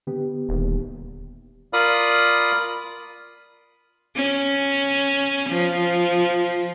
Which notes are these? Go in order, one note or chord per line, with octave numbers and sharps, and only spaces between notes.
D3 B3 G4
D#1
F4 A#4 D5 F5 B5 D#6
C#4
F3